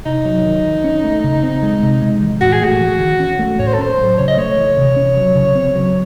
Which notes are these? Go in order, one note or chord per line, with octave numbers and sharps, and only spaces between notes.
C3 D#4
F#3
D#3
D#3
C#4
A3
C#3
C4
G#3
C3
G#3
E3
A2 F#4
G#4
A3 F#4
E3
D#3
C#4
A3
A2 C#5
C5
A4
C#4 C5
F#3
C#3 C#5
D#5
A3 C#5
E3
C3
C#4
F#3
C#3
C4
F#3